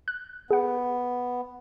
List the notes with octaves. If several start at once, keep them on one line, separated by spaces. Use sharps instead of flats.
F#6
B3 G#4 F#5